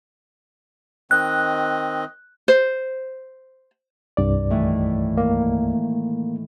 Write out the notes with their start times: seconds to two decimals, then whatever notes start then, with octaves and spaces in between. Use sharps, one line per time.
1.11 D#3 C4 D#5 F#6
2.48 C5
4.17 C2 G2 D5
4.50 A2 D#3 E3
5.17 A#3